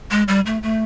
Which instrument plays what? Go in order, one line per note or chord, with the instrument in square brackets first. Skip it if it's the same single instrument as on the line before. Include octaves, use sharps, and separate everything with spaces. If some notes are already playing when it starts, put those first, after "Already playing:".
[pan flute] G#3
G3
A3
A3